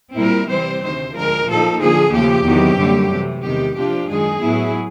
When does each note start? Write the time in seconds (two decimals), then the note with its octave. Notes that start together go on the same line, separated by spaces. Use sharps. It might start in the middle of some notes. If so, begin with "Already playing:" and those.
0.15 A#2 G3 C4 E4 A#4
0.47 C3 E3 G3 C4 C5
0.80 D2 C3 D#3 C5
1.13 D2 D3 F3 G#3 A#4
1.46 A#2 F3 A#3 D#4 A4
1.79 D3 F3 A#3 G#4
2.12 D#2 C#3 F3 A3 G4
2.45 E2 C3 D#3 F#3 B3
2.78 F#2 D3 G3 A#3
3.10 C3 E3 A3
3.43 E2 C3 D#3 G#3 G4
3.77 C3 F3 A#3 D4 F4 G4
4.09 F#2 D#3 G#3 G#4
4.43 A2 F#3 B3 E4